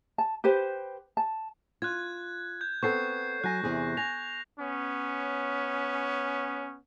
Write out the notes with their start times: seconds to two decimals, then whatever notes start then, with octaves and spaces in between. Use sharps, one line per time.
0.18 A5
0.44 G4 B4 C5
1.17 A5
1.82 F4 F#6 G#6
2.61 G6
2.83 B3 C4 A4 C#6 G6 C7
3.44 F#3 G#5 F#6 A#6
3.63 E2 C3 G#4
3.97 G#5 A#6 F7
4.59 B3 C#4